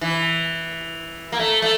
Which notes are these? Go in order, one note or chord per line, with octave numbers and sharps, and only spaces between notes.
E3
A#3
A3
A3